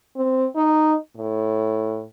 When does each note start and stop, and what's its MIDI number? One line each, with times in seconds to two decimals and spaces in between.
0.16 0.46 60
0.56 0.95 63
1.17 2.04 45